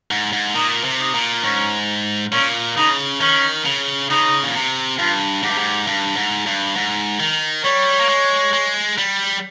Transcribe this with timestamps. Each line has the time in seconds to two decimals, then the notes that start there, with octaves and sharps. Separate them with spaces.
0.11 G#2
0.33 G#2
0.55 A#2 D#4
0.84 C3
1.00 D#4
1.14 A#2
1.44 G#2 C#4
2.32 A#2 C#4
2.77 C#3 D#4
3.21 D#3 C#4
3.66 C#3
4.10 C#3 D#4
4.43 A#2
4.54 C3
4.99 G2 F4
5.43 G#2 G4
5.50 G2
5.58 G#2
5.87 G2
6.16 G#2
6.46 G2
6.76 G#2
7.20 D#3
7.65 G3 C#5
8.00 A#3
8.09 G#3
8.53 G#3
8.98 G3